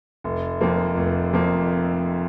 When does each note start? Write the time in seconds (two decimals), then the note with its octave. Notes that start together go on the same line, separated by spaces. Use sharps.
0.24 F1
0.61 F2 F3 A#3
0.97 F1
1.33 F2 F3 A#3